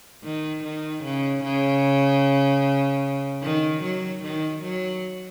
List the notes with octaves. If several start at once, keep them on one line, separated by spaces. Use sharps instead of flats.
D#3
D#3
C#3
C#3
D#3
F#3
D#3
F#3